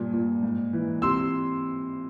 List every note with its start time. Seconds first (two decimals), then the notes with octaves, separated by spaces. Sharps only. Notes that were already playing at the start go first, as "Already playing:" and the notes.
Already playing: G2 A#2
0.13 A#2
0.43 G#2
0.73 E3
1.02 C3 C6 E6